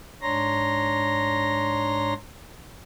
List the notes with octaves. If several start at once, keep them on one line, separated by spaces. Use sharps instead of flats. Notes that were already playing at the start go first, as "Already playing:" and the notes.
G#2 D4 C#5 A#5 C6 A#6